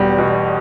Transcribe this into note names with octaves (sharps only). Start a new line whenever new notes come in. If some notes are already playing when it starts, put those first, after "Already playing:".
Already playing: E1 E2 G3
B2